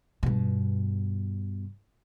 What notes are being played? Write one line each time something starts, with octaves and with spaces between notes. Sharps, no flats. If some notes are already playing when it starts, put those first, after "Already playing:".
G2 B2